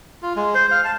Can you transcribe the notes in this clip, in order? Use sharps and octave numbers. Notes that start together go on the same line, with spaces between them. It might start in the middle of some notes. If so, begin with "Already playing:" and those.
F4
G#3
C5
F5
A5